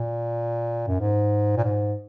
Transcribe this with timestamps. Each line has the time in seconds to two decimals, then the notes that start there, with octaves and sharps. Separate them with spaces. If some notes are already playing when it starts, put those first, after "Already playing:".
Already playing: A#2
0.88 F#2
1.00 G#2
1.56 A#2
1.64 G#2